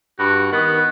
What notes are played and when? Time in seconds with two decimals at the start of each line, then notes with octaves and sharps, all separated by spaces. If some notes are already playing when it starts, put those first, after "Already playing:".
0.19 G2 F#4
0.52 D#3 B3